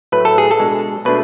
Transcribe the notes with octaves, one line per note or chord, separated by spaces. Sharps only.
A2 F#3 A3 B4
A4
G#4
A4
B2 G#3 D4
B2 A3 D4 B4